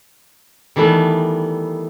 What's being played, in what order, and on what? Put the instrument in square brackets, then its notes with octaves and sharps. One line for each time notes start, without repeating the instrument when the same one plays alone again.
[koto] D#3 E3 G3 A3 B3